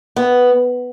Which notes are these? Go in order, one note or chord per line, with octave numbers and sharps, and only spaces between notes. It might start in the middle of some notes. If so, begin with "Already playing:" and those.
B3